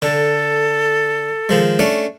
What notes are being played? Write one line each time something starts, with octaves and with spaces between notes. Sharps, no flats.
D3 A4
D#3 F3 G#3
A3 C#4 D4